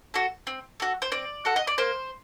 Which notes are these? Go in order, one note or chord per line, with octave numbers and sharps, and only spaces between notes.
F#4 A4
C4
F#4 A4
C5
C4 D5
F#4 A4 F#5
D#5
D5
A#3 C5